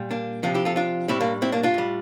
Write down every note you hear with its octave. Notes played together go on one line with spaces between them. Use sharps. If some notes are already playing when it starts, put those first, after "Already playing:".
Already playing: A#2 G3
A#3 D4
C3 F3 D4 F4
E4 G4
F4 A4
D4 F4
A2 G3 C4 E4
A#3 D4
C4 E4
A#3 D4
D4 F4
A2 G3